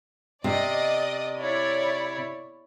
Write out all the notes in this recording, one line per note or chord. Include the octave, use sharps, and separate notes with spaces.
C3 D5 D#5
E4 C#5 D5